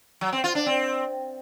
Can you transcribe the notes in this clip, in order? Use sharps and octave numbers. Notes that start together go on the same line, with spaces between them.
F#3
C4
F4
D4
C4